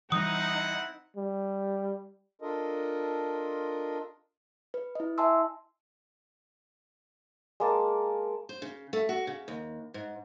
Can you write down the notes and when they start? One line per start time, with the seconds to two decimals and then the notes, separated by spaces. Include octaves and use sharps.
0.12 E3 G3 C4 D#4 E4 F#5 D#6
1.16 G3
2.42 D4 F4 A4 A#4 D#5
4.74 B4
4.95 E4 D#5
5.18 E5 G#5 A5 C6 E6
7.60 G#3 A#3 A5
8.49 C5
8.62 C#3
8.93 A3
9.09 F#4
9.27 C#3
9.48 D#2
9.94 G#2